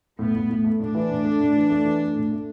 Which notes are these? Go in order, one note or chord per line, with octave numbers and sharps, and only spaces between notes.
A2 B3
A2
A2
A3
A2 D4
E3
A2
A3
A2
E3
A3
E3
A3
A2
A3